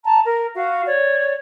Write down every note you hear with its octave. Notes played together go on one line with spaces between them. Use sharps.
A5 A#5
A#4
F#4 F5
C#5 D5